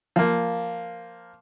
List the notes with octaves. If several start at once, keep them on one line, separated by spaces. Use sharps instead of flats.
F3 A#3